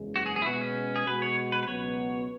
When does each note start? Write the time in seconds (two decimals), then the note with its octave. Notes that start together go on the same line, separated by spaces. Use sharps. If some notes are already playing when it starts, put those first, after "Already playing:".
Already playing: F#1 E2 C#3 G#3
0.16 F#4
0.26 G#4
0.36 G#4
0.42 E4
0.46 B2 G#3 B3 F#4
0.61 C#4
0.96 G#4
1.07 B2 G#3 B3 F#4 B4
1.22 C#5
1.52 B4
1.63 B4
1.68 C#2 B2 F#3 B3 C#5